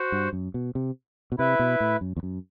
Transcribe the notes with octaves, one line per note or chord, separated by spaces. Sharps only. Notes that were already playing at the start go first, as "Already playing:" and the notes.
Already playing: F#4 C5 F#5
G2
F#2
B2
C3
B2
C3 E4 B4 E5
B2
A2
F#2
E2
F#2